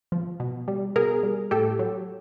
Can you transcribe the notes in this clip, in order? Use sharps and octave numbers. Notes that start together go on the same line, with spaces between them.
F3
B2
G3
B2 G#4 A#4
G3
A2 G4 A4
F#3